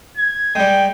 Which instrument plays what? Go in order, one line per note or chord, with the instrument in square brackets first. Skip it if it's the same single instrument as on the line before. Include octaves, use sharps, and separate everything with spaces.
[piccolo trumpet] G#6
[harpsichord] G3 G#3 [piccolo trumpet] G5